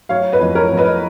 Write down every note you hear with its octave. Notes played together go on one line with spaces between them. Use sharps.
F#3 C#5 F5
B4 D#5
F2
A#4 C#5
F2
B4 D#5